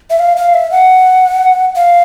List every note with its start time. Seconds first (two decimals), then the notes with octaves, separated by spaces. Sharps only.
0.10 E5
0.19 F5
0.36 F5
0.54 E5
0.71 F#5
1.76 F5